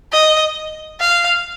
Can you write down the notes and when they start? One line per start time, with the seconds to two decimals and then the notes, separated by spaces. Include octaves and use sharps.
0.12 D#5
1.01 F5